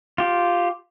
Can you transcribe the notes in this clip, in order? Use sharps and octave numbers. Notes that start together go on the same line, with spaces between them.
F4 G4